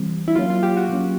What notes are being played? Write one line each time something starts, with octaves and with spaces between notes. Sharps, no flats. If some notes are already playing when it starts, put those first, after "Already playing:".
Already playing: E3 G3 C4
E4
F#3 A#3 C#4 F4
F4
G4
F#4
F#3 A#3 C#4